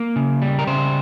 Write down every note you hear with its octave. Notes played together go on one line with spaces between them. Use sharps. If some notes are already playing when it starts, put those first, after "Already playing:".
Already playing: A#3
C#3
G3
A#4
C#3 C5